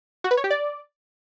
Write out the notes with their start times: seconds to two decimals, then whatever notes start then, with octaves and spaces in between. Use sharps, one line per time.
0.24 F#4
0.31 B4
0.37 C#5
0.44 G4
0.50 D5